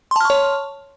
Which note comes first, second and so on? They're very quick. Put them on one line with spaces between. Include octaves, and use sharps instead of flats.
C6 A5 F6 C#6 C#5